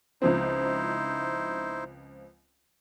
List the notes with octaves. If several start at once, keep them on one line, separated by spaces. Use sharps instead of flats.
C#2 F3 C4 D#4 E4 C5